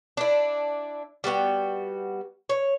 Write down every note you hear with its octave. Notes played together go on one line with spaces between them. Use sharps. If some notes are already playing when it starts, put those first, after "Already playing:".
D4 E4
G3 B3 F#4 G5
C#5